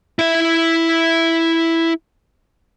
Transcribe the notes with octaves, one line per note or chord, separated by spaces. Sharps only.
E4 E5